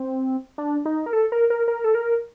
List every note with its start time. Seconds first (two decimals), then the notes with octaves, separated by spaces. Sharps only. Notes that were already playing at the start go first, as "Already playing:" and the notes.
Already playing: C4
0.58 D4
0.86 D#4
1.06 A#4
1.13 A4
1.32 A#4
1.50 A#4
1.68 A#4
1.84 A4
1.95 A#4